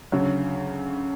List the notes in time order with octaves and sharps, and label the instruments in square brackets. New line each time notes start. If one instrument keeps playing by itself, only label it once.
[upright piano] D2 C#3 F#3